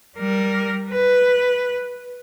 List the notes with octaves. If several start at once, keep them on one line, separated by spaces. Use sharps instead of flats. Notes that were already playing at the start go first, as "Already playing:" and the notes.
G3 A#4
B4